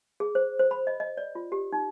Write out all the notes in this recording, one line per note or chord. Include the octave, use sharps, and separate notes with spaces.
G#4
C5
C5
B5
D#5
D#5
D5
F4
G4
D#4